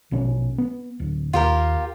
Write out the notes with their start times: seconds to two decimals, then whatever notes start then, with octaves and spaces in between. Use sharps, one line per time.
0.11 A#1 B2 C#4
0.58 B3
1.00 D1
1.33 D#2 F4 G4 A#4